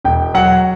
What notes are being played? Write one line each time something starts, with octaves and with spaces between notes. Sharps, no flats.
E1 G5
F#3 F#5